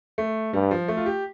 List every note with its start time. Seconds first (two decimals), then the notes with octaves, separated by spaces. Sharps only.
0.18 A3
0.53 G2 G3
0.71 F3
0.88 A3
0.97 F4
1.06 G4